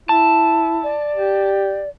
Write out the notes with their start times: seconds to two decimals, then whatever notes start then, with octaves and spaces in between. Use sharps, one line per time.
0.09 E4 A5
0.83 D5
1.15 G4